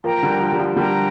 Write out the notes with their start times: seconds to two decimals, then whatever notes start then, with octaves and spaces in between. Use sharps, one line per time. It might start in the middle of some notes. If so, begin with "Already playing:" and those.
0.04 F3 A#3 A#4 G5 A#5
0.23 D3 G3
0.40 F3
0.53 G3
0.59 F3
0.76 D3 G3 A#4 G5 A#5